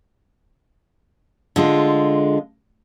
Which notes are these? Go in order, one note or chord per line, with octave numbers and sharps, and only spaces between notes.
D3 G#3 F4